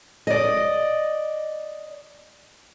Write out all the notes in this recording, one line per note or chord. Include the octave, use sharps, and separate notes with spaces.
D5 D#5